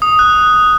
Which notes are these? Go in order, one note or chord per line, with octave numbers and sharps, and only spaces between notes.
D#6
F#6